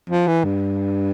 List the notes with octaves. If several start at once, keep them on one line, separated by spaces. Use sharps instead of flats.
F3
E3
G2